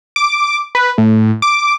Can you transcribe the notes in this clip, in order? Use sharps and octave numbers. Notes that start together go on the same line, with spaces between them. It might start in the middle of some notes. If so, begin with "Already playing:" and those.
D6
B4
A2
D6